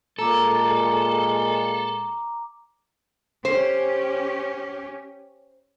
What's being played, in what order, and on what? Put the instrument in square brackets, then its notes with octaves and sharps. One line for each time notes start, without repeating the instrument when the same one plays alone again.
[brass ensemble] A#2 G#3 [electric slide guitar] A4 [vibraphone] A#5 D6
[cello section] C#4 G4 [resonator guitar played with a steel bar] C5